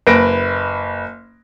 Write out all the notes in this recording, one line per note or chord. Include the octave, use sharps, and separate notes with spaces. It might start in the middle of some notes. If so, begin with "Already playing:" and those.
F#1 B4 A#6 D7